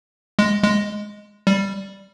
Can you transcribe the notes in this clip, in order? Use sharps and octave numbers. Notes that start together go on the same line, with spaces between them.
G#3
G#3
G3